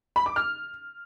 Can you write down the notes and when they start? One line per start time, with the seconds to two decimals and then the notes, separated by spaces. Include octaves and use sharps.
0.16 B5
0.26 D6
0.36 F6